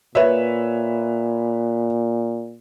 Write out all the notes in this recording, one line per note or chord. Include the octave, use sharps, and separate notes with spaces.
A#2 B4 C#5 E5